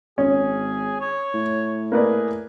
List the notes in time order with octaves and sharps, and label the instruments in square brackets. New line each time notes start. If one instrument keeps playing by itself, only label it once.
[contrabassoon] G#1 [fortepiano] C#4 [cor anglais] G#4
[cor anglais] C#5
[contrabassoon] A2
[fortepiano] A#3 B4 D5 [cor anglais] G#4